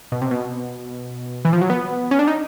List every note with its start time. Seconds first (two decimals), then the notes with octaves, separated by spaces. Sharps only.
0.12 B2
0.22 C3
0.31 B2
1.45 E3
1.53 F3
1.61 F#3
1.70 B3
2.11 C#4
2.19 D4
2.28 D#4